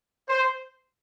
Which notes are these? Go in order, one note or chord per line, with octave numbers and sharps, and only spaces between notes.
C5